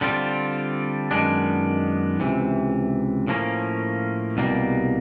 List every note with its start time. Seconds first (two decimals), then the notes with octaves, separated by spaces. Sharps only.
0.01 D3 G3 C4 F4
1.11 F#2 D#3 G#3 B3 D4
2.20 C#2 C3 E3
3.27 A2 F3 A#3 C#4
4.37 C2 B2 G3 A#3